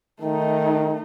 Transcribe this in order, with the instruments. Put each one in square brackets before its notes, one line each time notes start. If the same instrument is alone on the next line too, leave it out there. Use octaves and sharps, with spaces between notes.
[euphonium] D#3 [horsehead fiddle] A3 D#4